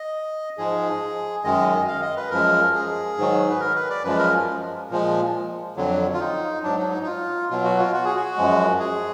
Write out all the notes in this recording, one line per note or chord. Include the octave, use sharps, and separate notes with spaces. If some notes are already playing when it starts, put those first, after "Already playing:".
Already playing: D#5
G#2 F3 G#3 G#4
F#2 D#3 G#3 D#5
F5
D#5
B4
F#2 F3 G#3 A#4
G#4
G#2 D#3 F#3
B4
A#4
B4
D5
F#2 F3 G#3 B4
A#4
A#2 F3 G#3
F2 D3 F#3
F4
D#4
G#2 F#3 D4
D#4
D#4
D#4
F4
B2 F#3 F4
F#4
F4
F#4
G#4
F#4
F#2 F3 G#3
G#4